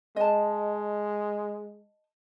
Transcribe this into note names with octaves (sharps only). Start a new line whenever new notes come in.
G#3 D#5 A5